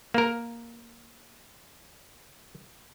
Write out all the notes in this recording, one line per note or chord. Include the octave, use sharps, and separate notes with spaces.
A#3 A#4